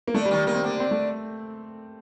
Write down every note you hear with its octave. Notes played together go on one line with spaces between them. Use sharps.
A#3
D3 A3 D4
G3
D#3 D#4
G3
D#3 A#3 D#4
C4
D3 A#3 D4
C4
A3